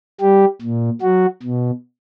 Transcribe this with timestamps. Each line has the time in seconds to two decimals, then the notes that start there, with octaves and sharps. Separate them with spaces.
0.21 G3 G4
0.61 A#2
1.02 F#3 F#4
1.42 B2